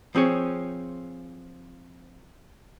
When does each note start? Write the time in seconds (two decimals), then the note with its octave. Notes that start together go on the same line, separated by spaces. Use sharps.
0.15 F3 C4 G#4 C#5